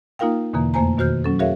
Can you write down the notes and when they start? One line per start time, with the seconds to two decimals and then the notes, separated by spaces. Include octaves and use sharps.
0.19 A#3 D#4 F4 A#4 F5 G5
0.53 E2 B2 D3 E3 A#3
0.74 F2 A3 A#3 C5 G#5 A#5
0.98 B2 D#3 F#4 C5 F6 G6
1.24 F#3 C#4 A4
1.40 F#4 G#4 A#4 C#5 E5 F5